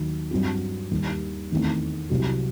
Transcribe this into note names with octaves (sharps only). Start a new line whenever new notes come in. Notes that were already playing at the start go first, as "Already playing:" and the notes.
Already playing: D#2 D#3 F#3
G2 F#3 C4 F#4
D#2 D#3 G3
E2 D#3 A3 C4
C2 C3 F#3